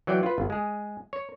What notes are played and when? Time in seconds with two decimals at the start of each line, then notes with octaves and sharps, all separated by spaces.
0.07 E3 F#3 D5 G5
0.23 F4 B4
0.38 G1
0.50 G#3 G#4
1.13 C#5